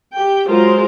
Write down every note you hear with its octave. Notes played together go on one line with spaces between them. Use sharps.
G4 G5
F#3 G#3 F4 A#4 C5